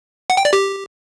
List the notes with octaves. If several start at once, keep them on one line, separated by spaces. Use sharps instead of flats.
F#5
G5
D5
G4